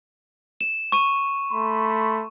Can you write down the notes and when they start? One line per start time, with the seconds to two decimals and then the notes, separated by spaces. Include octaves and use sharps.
0.61 E7
0.92 C#6 D#7
1.51 A3 B5 C6